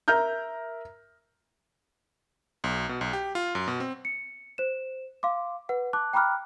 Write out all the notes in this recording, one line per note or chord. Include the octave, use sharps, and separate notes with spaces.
A#4 E5 A#5 F6 G6
B1
B2
B1
G4
F4
F#2
B2
C4
C#7
C5 E7
F5 C6 D6
B4 F#5
A5 D6 F#6
G5 A#5 B5 D6 F6 F#6